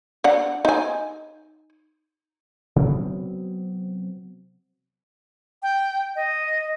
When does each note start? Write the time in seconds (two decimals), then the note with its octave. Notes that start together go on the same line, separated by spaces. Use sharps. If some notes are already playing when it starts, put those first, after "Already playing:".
0.24 D4 F#5
0.65 D#4 G#5
2.76 C3 F#3 B3 C4
5.63 G5
6.16 D#5